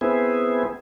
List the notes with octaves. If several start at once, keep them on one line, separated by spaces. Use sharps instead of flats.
B3 C4 E4 G#4